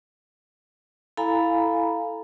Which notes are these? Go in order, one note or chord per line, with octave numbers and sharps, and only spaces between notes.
E4 A4 F5 G#5 A#5 B5